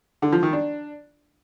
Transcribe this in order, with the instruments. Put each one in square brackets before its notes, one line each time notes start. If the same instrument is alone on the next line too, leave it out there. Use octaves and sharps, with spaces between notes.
[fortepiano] D3
F3
D#3
D4